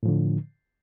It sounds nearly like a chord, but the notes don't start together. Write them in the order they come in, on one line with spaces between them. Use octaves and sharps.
A2 F3 D3